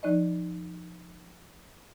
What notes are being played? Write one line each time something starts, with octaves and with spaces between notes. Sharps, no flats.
F3 D#4 D5 D#5